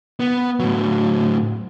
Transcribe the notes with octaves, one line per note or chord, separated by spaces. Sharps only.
B3
A2 F#3